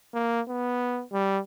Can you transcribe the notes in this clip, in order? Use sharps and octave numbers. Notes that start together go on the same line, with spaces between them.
A#3
B3
G3